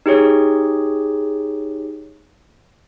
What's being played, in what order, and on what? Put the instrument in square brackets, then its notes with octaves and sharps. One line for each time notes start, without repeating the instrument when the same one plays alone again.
[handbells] D#4 G4 G#4 C#5